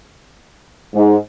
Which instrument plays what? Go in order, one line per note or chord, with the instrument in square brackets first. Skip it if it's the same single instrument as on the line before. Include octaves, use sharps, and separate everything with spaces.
[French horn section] G#2